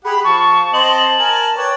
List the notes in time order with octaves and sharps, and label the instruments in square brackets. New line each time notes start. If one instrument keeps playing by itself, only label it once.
[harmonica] G4 F#5 [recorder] G#4 [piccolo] B5
[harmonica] F3 [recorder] A5 [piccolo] C#6
[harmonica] C4 C5 D#5 [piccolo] F#7
[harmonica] A#4 G#5
[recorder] B4 [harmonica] C#5 D5 G5